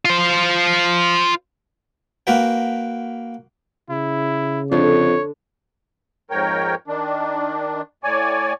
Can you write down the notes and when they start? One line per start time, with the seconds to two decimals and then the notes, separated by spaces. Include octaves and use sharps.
0.05 F4 C5
2.27 A#3 F#4 B4 G5
3.90 C#3 E4
4.72 F2 D3 D4 C#5
6.30 F2 G#2 A#4 C#5 G5
6.88 D#3 D4
8.04 A2 C#5 D5 G#5